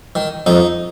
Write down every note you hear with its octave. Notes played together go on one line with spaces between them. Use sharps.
D#3
F2 D#4